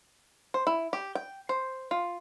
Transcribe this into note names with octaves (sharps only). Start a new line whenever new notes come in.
C5
E4
G4
G5
C5
F4